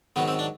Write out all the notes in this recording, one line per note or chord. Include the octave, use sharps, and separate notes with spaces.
G#2 D#3 F#3 B3
C4
D4